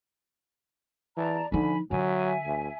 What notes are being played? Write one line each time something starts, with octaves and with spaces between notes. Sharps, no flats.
E3 D5 A5 A#5
D3 F3 D#4 G#5 B5
D3 F#3 E5 G#5
D2